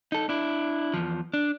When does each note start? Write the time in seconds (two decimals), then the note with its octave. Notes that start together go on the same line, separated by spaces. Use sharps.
0.12 D#4 A4
0.29 D4 E4
0.94 E2 F3
1.34 D4